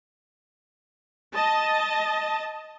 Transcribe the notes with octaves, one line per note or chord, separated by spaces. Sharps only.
D#5 A5